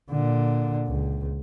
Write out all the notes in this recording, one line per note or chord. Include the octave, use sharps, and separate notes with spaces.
A#2 D3
C#2